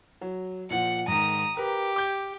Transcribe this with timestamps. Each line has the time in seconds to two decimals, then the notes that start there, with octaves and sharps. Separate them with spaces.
0.21 F#3
0.71 A#2 F3 F#5
1.08 G#2 D#3 A#5 D#6
1.57 G4 A#4 B4
1.96 D6 G6